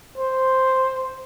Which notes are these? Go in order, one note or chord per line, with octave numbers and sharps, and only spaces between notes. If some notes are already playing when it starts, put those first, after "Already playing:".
C5